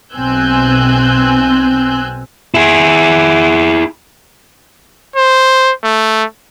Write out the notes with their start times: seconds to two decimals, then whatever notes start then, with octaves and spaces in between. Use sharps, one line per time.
0.14 B1 C4 G#5 E6 F#6 G6
2.54 E4 G#4
5.16 C5
5.84 A3